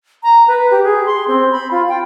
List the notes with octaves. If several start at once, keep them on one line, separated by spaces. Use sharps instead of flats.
A#5
B4
G4
G#4
C6
C4
B5
F4
G5